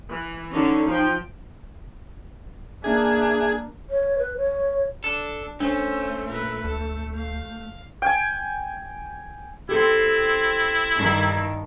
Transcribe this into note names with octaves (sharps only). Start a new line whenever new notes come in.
E3
D3 C#4 D#4
F3 G5
A#3 D4 G#4 E5
C#5
B4
C#5
D4 A4
A3 C#4 D4 C5
A#2 A#4 B4
D2 A4
F5
G5 G#5
C4 E4 G4 A4
G2 D#3